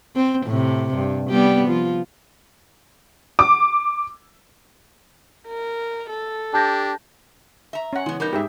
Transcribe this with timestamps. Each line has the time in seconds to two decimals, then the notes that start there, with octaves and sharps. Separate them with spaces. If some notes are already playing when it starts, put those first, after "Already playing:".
0.16 C4
0.46 A2 C3
0.94 G2
1.30 G3 B3 G4
1.67 F3 F4
3.39 D6
5.47 A#4
6.10 A4
6.54 D4 G4 A5 G6 A#6
7.73 E5 A#5
7.93 C#4 F#5
8.06 C#3 E3 G#3 B3
8.20 G3 B3 D#4 A#4 G6
8.33 G#2 G4 G#4 E5